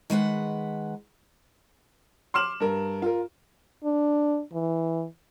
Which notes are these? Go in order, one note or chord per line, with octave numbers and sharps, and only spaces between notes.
D#3 G#3 B4 F#5
C6 D6 F6 E7 F#7
G2 A#4
F4 A#4
D4
E3